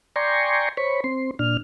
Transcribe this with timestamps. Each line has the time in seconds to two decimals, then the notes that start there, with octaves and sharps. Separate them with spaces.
0.16 D5 G5 G#5 A#5 C6 C#6
0.77 C5 C#5 B5 C#6
1.04 C4 C6
1.39 A#2 D4 F6